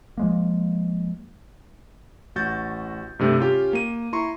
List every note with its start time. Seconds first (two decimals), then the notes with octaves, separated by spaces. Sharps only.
0.18 F3 G#3 A#3
2.35 A1 F#4 G6 A6
3.19 G2 C3 A3 C4
3.39 C#4 F4 G4
3.73 A#3 D#7
4.13 E4 A#5 C6 C#6